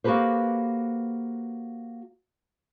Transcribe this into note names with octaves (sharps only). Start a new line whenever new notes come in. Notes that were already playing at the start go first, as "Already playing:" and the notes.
A#3 F#4 G4 A4 B4 C5